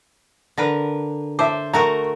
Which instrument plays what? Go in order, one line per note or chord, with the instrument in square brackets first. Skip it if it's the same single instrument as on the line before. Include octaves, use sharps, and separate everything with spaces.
[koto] D3 A#4 B4
[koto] C5 [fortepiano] E5 A5 D6
[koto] A3 F#4 A#4 [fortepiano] A#5